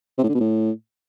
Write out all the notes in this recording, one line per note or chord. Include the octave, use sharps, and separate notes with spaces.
C3
A2
D3
B2
A2